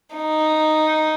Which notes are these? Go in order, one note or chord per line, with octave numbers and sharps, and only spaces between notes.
D#4